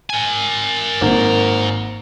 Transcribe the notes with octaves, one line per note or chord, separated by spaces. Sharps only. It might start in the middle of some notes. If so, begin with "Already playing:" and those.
A#4 G#5
G#1 A#3